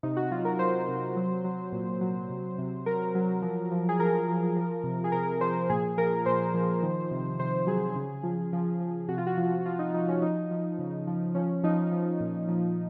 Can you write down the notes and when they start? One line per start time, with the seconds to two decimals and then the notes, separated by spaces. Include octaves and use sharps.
0.03 C3 D#4
0.17 F#4
0.31 F#3 F4
0.45 A#4
0.59 F#3 C5
0.88 C3
1.16 F#3
1.44 F#3
1.72 A#2
2.01 F#3
2.30 C3
2.58 C3
2.86 F#3 A#4
3.15 F#3
3.42 F3
3.71 F3
3.89 G#4
3.99 F3 A#4
4.28 F3
4.56 F3
4.84 C3
5.04 G#4
5.12 C3 A#4
5.41 F3 C5
5.70 A#2 G#4
5.97 F3 A#4
6.26 A#2 C5
6.54 F3
6.83 D#3
7.11 C3
7.39 C3 C5
7.67 F#3 G#4
7.96 C#3
8.23 F3
8.53 F3
8.80 F3
9.09 C3 F#4
9.18 F4
9.27 F#4
9.37 F3
9.66 F3 F4
9.79 D#4
9.94 F3 D#4
10.08 C#4
10.22 F3 D#4
10.51 F3
10.79 C#3
11.07 F3
11.35 F3 C#4
11.63 F3 D#4
11.92 F3
12.20 A#2
12.48 F3